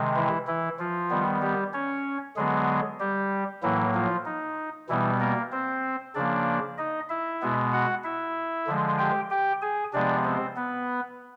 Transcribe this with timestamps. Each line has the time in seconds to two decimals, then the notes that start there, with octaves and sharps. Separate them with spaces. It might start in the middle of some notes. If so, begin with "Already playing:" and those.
Already playing: C3 D#3 G#3
0.16 E3 E4
0.47 E3 E4
0.79 F3 F4
1.10 D#3 G3 B3
1.42 G3 G4
1.73 C#4 C#5
2.36 D3 F#3 G#3 B3 G#4
3.00 G3 G4
3.63 A2 E3 F#3 A#3 E4
3.94 F3 F4
4.25 D#4
4.89 B2 E3 G3 B3 E4
5.20 A#3 A#4
5.52 C4 C5
6.15 C#3 F3 A#3 D4 D5
6.78 D#4 D#5
7.09 E4 E5
7.42 B2 G#3 B3
7.73 F#4 F#5
8.04 E4 E5
8.67 D3 F3 G#3
8.98 G4 G5
9.30 G4 G5
9.62 G#4 G#5
9.93 C3 F3 G#3 B3 D4 D5
10.24 C4 C5
10.56 B3 B4